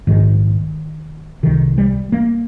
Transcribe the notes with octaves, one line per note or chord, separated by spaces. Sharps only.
A#1 G#2 D#3
C2 C3 D#3
G3
A#3